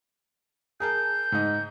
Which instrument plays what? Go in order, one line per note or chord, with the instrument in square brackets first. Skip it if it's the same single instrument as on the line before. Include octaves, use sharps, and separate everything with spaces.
[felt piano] G#4 A#4 A5 [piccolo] G6
[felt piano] G#2 D#5